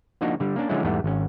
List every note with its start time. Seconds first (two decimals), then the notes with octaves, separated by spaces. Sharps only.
0.21 F3 A#3 D4 D#4 F#4
0.40 D3 G3
0.56 A#3 C#4 D4 A5
0.69 D3 F3 F#3 G#3 C#4 E4
0.85 E2 G#2 G3 A3 B3
1.04 G#1 C#4